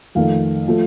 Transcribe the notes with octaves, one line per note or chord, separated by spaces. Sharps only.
F2 D#3 A3 F5
F3 A3